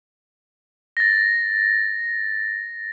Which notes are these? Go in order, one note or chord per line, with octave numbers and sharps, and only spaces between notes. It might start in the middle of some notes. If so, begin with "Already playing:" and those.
A6 A#6